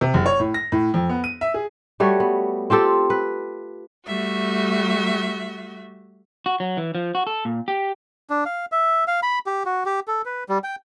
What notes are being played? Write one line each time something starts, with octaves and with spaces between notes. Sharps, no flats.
C3
F#1
C#5
A2
A#6
A2
F2
B3
D#7
E5
G#4
G3 A3 F#4 C#5
B3
C4 F4 G4 A4
B4
G3 A3 F#4 E5
F#4
F#3
E3
F3
F#4
A4
A#2
G4
D4
F5
E5
F5
B5
G4
F#4
G4
A4
B4
G3
G5